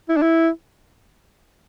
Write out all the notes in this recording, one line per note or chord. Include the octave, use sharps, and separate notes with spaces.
E4
D4
E4